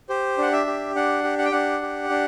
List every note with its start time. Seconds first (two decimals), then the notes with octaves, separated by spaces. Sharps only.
0.09 G4 C5
0.38 D4 F#5
0.53 E5
0.67 G4
0.95 D4 F#5
1.24 G4
1.38 F#5
1.45 G5
1.52 D4 F#5
1.82 G4
2.10 D4